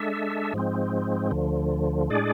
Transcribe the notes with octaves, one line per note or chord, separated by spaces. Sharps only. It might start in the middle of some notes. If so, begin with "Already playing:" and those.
Already playing: G#3 D4 A4 E5
G#2 F3 G#3 C4
D2 D3 F3
A2 G#3 D4 G#4 D5